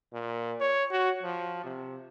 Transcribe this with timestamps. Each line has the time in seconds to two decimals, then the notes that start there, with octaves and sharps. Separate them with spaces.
0.13 A#2
0.61 C#5
0.91 F#4
1.23 F3
1.64 C3